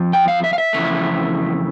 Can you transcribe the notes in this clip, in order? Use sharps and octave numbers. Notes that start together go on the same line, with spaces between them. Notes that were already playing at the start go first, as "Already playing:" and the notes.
Already playing: F2 F3
G5
F5
E5
F5
E5
F2 C#3 E3 A3